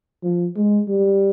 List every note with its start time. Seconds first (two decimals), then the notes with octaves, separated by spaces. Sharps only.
0.24 F3
0.56 G#3
0.88 G3